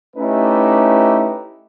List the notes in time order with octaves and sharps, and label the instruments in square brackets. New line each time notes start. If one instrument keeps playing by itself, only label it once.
[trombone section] A3 C#4 D#4 E4 G4 B4